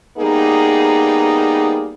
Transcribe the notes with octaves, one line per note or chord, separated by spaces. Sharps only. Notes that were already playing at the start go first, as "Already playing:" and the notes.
G3 A#3 B3 D#4 G#4